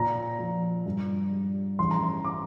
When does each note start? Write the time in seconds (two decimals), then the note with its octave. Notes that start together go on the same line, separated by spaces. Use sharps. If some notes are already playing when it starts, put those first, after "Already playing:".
Already playing: A#2 A#5
0.39 F3
0.86 G2
1.32 G3
1.79 A1 C6
1.91 A#5
2.04 C6
2.25 D6